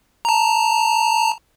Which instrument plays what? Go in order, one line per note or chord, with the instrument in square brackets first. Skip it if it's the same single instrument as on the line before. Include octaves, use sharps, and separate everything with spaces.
[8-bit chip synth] A5 A#5